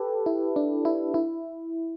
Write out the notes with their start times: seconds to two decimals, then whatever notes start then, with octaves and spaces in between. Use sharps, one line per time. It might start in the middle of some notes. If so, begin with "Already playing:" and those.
Already playing: G4 A4 B4
0.26 E4
0.56 D4
0.85 E4
1.14 E4